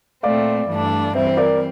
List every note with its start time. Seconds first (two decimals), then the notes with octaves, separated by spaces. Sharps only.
0.23 A#2 A3 C4 D5 F5
0.69 G2 E3 A3 D4
1.15 E3 G3 C4 C5 E5
1.27 C5
1.37 A#4 D5